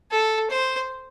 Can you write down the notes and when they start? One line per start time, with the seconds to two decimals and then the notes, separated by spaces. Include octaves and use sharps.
0.11 A4
0.50 C5